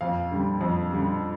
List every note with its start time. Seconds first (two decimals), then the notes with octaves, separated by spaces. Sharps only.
0.01 F2 F5
0.31 D3 G3
0.61 F2
0.91 D3 G3